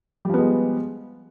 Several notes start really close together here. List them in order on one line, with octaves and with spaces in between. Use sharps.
G3 F3 B3 G#3